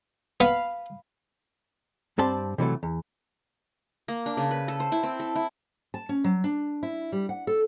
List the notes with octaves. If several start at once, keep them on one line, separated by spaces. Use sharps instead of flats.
B3 F5 B5
G2 C4 G4 D5 A5 C6
C3 E3 F#3 A3
E2
A#3
D4
C#3
B4
A4
C5
E4
C4
A4
E4
A5
C#4
F#3
D4
E4
G3
F#5
A4